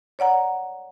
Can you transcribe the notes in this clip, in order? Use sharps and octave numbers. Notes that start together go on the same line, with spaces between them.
C#5 D5 F#5 A#5